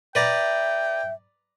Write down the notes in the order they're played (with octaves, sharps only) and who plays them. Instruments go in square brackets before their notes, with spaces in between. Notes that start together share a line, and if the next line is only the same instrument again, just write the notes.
[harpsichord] B4 D5 A#5 [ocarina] E5 [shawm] G5